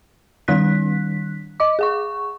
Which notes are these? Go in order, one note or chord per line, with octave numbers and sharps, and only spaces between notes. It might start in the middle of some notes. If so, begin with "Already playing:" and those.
D#3 G3 D4 F#6 B6
D#5 D6
G#4 F#5 C#6